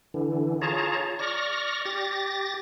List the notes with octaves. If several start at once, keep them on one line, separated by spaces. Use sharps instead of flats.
D3 E3
F4 G#4 C#5 A5 A#5
D5 C#6 F6 A#6
G4 A6 A#6